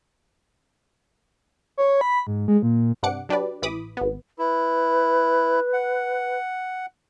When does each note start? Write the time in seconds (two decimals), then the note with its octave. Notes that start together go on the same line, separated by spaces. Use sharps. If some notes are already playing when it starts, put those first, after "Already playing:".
1.77 C#5
2.01 B5
2.27 G#2
2.48 G#3
2.63 A#2
3.03 G2 C3 D4 F#5 D6 C#7
3.29 F#3 D4 G4 B4 D5
3.62 A1 E3 B5 D6 D#6
3.97 G#1 B3
4.39 E4 B4
5.73 F#5